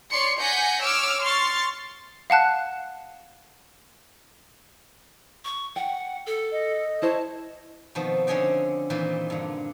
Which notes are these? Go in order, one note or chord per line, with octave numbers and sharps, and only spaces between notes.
C#5 D5 C6 C#7
F#5 G#5 G6 A#6 B6 C#7
C#5 D6 E6 F6
C6 C#6 F6 A6 C7
F5 F#5 A5 F#6
C#6
F#5 G5
A4
D#5
E4 C5 C#5 A5
B2 D#3 F3 B3 C4
D3 C4 C#4 C#5 D#5 G5
A#2 D#3 E3 C4 D#4 F4
G2 D3